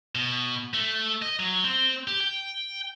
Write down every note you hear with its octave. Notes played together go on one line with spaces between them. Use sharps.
B2
A3
D#5
F#3
C4
G4
G5